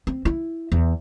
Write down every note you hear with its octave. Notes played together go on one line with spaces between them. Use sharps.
C4
E4
E2